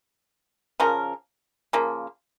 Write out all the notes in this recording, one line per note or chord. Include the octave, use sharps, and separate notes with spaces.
C#3 F3 C#4 A#4
C#3 F3 A#3